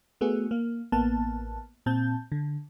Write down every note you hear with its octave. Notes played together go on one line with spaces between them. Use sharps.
A3 B3 F#4 G#4
A#3
A1 A#3 B3 A5
A#2 C4 A5 G6
D3